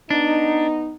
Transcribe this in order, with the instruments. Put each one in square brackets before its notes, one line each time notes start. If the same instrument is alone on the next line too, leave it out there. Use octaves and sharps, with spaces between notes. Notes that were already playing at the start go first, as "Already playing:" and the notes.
[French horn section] B3 D#4 [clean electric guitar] D4